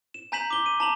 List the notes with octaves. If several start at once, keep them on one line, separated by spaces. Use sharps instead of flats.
E7
G#5 A#5 G6 B6 E7 F#7
D6 G7
D#7
A5 A#5 F#7